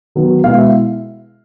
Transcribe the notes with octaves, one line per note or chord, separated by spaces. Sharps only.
D#3 F#3 B3
B2 G#3 B3 E4 F5
E5